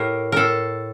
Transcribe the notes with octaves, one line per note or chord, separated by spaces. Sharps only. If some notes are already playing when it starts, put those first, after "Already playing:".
Already playing: A2 G4 A#4
A2 A4 A#4